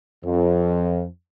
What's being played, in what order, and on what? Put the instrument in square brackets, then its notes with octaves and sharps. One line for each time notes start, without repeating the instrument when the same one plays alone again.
[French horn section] F2